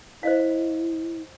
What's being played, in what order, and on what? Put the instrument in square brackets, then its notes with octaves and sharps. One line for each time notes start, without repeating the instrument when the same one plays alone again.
[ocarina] E4 [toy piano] C5 D#5 F5